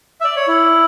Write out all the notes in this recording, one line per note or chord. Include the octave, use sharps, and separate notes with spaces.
E5
D5
C#5
E4